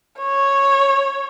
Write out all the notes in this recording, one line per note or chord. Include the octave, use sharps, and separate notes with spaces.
C#5